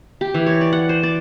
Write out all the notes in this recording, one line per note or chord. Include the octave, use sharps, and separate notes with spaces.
G4
E3
C#5
D5
F#5
C5
D5